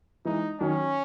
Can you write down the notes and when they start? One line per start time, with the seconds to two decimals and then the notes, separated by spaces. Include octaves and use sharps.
0.25 E3 G#3 D#4
0.60 D#3 F#3 C#4